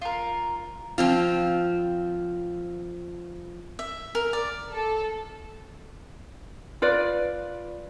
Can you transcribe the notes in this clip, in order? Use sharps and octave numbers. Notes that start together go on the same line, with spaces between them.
F4 A#4
F3 C4 F4
E5
A#4
D5
A4
F4 B4 D5